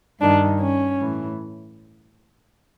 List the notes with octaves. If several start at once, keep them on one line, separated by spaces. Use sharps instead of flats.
G2 D#3 D4
C#4
A2 E3